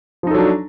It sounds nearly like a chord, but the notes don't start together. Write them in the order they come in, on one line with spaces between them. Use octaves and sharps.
F3 D#4 A4 F#3 D4